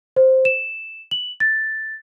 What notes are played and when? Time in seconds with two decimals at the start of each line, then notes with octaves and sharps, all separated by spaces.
0.16 C5
0.45 E7
1.11 F#7
1.40 A6